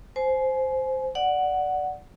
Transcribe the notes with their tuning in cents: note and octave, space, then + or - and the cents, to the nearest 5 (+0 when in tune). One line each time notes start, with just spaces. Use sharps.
C5 -5 G#5 +30
D5 +0 F#5 +0